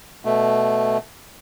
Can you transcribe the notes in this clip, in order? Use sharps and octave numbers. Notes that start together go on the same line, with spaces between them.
B2 A3